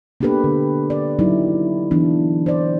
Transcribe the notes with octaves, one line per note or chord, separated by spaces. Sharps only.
A#3 B3 D4 G4 A4 B4
D3
D5
F#3 D#4 E4
E3 B3 D4
C5 D5